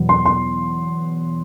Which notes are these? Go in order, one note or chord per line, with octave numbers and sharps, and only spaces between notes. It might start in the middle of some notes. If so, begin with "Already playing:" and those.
Already playing: E2 B2 F#3 B3
C6
C6